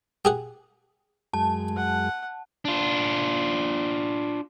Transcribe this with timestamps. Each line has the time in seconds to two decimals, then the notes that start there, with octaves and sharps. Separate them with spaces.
0.25 G4 G#4 F#5
1.34 F#2 G#3 A5
1.77 F#5
2.65 D4 F4